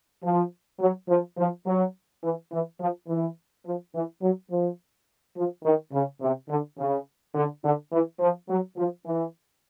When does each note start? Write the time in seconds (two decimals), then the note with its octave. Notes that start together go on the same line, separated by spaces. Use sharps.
0.23 F3
0.80 F#3
1.08 F3
1.37 F3
1.66 F#3
2.22 E3
2.51 E3
2.79 F3
3.07 E3
3.65 F3
3.93 E3
4.21 F#3
4.50 F3
5.36 F3
5.64 D#3
5.93 C#3
6.21 C3
6.49 D3
6.78 C#3
7.34 D3
7.63 D3
7.91 E3
8.20 F3
8.49 F#3
8.77 F3
9.05 E3